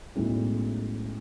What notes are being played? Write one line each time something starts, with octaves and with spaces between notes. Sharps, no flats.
B1 A2 G#3 C#4 E4